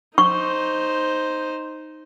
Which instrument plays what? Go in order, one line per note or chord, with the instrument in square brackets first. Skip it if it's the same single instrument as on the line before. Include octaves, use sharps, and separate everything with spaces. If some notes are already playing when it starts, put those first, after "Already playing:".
[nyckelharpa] D#4 C5 [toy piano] C#6